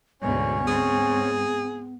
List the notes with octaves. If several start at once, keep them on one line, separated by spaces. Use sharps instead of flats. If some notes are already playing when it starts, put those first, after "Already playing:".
D2 G#2 B2 B3 C#4 C#5
G#2 C4 G#4